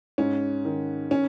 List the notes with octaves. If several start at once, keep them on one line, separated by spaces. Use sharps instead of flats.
G#2 C#4
D#3
C#4